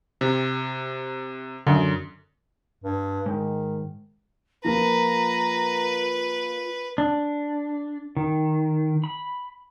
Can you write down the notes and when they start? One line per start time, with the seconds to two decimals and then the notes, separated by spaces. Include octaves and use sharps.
0.21 C3
1.67 F#2 D3
2.84 G2
3.26 G#2 D#3
4.65 F3 A#3 F4 A#4 B4 A#5
6.98 D4
8.17 D#3
9.04 B5